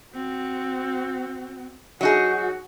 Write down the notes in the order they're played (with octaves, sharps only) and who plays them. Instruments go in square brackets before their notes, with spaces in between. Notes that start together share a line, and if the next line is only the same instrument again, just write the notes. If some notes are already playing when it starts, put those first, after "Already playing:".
[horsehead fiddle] C4 F#4
[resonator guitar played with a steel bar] F#3 D#4 G#4 [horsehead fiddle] F#4